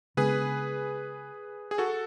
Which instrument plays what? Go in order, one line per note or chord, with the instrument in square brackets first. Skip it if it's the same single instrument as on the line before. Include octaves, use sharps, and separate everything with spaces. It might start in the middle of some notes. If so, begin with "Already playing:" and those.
[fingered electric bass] C#3 G#3 B3 D4 [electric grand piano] G#4 B4
[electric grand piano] G#4
F#4 A4